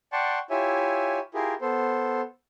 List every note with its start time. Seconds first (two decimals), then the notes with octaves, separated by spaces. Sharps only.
0.13 D5 F#5 G5 A5 C6 C#6
0.50 E4 F4 G4 C#5 E5 G#5
1.34 E4 F4 G4 G#4 A#4
1.61 B3 A4 C5